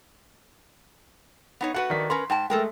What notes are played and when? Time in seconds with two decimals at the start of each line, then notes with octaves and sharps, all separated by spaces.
1.61 B3 D#4 C#5
1.74 A3 F#4 B4 F#5
1.90 D#3 D4 B6
2.10 C#4 A#4 B4 C6
2.30 G#2 G5 A5
2.50 G#3 A3 A4 A#4 G5